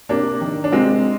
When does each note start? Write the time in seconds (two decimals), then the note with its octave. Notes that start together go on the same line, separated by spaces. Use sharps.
0.09 C3 A#3 D4
0.41 D#3
0.64 D4
0.72 C3 G#3 C4